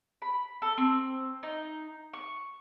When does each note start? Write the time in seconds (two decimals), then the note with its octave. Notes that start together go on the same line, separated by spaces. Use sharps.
0.22 B5
0.62 A4
0.78 C4
1.43 D#4
2.13 C#6